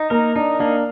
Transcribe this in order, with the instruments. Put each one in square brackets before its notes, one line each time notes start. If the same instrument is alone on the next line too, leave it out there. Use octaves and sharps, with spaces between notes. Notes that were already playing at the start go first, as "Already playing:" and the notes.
Already playing: [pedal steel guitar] D#4
[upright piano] A#3 [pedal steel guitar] A#4
[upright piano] D4 [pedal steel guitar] D#4
[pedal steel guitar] A#3 [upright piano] D4